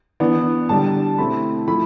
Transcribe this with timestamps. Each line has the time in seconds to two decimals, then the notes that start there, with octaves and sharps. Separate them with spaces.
0.20 E3 B3 D4
0.69 D3 G3 D4 A5
1.18 B2 A3 C4 E4 B5
1.68 F3 A3 E4 B5